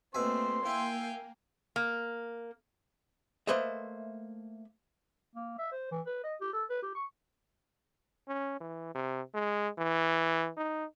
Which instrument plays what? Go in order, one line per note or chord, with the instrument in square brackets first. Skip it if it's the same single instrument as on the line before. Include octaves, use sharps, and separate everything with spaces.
[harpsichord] B2 E5 G#5 [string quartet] A3 C4 [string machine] A#3 [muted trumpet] C6
[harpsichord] E4 [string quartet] F5 G5 G#5
[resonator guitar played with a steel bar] A#3
[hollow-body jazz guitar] A3 A#3 B4 C5 D#5 E5
[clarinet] A#3
E5
C5
E3
B4
D#5
G4
A4
B4
G4
C#6
[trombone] C#4
E3
C3
G#3
E3
D#4